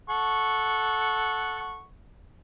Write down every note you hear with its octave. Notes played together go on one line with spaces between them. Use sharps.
A4 F#5 C#6